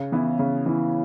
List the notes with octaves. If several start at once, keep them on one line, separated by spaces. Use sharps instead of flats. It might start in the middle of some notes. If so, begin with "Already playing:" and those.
Already playing: C#3
E3 B3 E4
C#3
E3 B3 E4